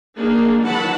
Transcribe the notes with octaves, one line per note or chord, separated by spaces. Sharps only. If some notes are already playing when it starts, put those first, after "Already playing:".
A#3 D4 D#4 G#4
D#3 E3 F#3 F#5 A5 B5